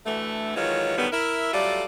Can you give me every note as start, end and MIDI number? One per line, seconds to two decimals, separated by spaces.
0.06 0.52 38
0.06 0.52 50
0.06 0.52 52
0.06 0.52 57
0.56 0.95 51
0.56 0.95 52
0.56 0.95 54
0.56 0.95 56
0.56 0.95 65
0.56 0.95 73
0.97 1.07 50
0.97 1.07 51
0.97 1.07 54
0.97 1.07 55
0.97 1.07 59
1.12 1.50 64
1.12 1.50 70
1.12 1.50 76
1.53 1.85 54
1.53 1.85 55
1.53 1.85 57
1.53 1.85 65
1.53 1.85 69
1.53 1.85 74